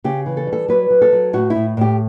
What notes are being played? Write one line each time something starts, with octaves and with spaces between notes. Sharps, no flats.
C#3 G4
E3
A4
G3
A4
F#3 B4
F#3
A4
F#3
A2 F#4
E4
A2
A2 G4